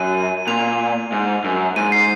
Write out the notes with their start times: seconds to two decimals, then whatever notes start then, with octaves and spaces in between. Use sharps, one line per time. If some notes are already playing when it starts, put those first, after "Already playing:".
Already playing: F#2 D#7
0.47 A#2 F7
1.12 G#2
1.44 F#2
1.76 G#2 D#7
1.92 C7